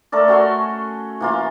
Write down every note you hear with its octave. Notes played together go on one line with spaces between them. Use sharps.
A3 A4 A#4 D5
C#4 F#4 A4 C6
E3 A#3 F4